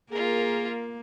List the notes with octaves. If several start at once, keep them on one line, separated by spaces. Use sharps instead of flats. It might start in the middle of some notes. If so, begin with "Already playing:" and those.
A#3 F4 G#4 A#4